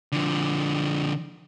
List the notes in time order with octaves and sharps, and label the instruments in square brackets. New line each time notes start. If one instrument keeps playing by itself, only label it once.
[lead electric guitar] D3 F3